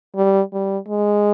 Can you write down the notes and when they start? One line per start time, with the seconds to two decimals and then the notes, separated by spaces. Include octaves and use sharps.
0.16 G3
0.53 G3
0.88 G#3